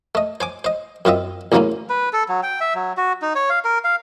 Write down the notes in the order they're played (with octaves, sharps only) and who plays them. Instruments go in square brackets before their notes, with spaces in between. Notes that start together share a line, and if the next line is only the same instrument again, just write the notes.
[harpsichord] A3 D#5
C5 G#5 D6
C5 D#5
F#2 C4 F4 D#5 E5
A1 E2 C#3 F#3 A#3 C#4
[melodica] B4
A4
F#3
G5
E5
F#3
F#4
D#4
C#5
F5
A#4
F5